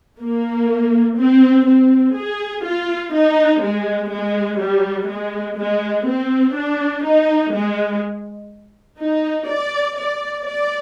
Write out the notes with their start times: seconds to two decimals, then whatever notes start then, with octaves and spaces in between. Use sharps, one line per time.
0.20 A#3
1.19 C4
1.67 C4
2.15 G#4
2.65 F4
3.14 D#4
3.62 G#3
4.12 G#3
4.59 G3
5.08 G#3
5.58 G#3
6.07 C4
6.56 D4
7.05 D#4
7.54 G#3
9.00 D#4
9.48 D5
9.98 D5
10.47 D5